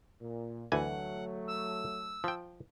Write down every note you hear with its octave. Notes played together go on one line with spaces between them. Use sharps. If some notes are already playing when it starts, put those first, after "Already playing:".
A#2
D2 E3 F#3 A3 F#5 G#5
E6
F3 G5